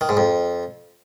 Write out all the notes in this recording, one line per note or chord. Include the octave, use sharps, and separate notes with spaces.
D#3
G#2
F2